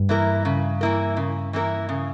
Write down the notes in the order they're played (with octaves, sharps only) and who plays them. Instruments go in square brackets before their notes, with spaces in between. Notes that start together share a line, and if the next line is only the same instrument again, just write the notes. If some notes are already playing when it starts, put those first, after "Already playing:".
Already playing: [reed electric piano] G2
[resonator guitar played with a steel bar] E3 A#3 E4 A#4
C#3
E3 A#3 E4 A#4
C#3
E3 A#3 E4 A#4
C#3